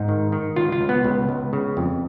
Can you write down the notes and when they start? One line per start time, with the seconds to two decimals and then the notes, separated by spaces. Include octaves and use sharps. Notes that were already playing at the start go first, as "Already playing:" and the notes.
Already playing: G#2 D#4
0.08 D#3
0.32 D#3
0.56 C#2 F4
0.72 F4
0.81 C#2
0.89 B3
1.04 C#2
1.29 C#2
1.53 C#3
1.77 F2